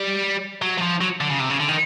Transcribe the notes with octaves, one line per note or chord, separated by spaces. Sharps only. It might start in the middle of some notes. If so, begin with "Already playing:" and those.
Already playing: G3
F#3
F#3
F3
F#3
D3
C#3
C3
C#3
D3
D#3